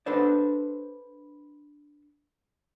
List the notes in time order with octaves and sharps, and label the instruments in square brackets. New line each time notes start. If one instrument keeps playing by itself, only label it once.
[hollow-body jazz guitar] D4 A4 B4 C5 D5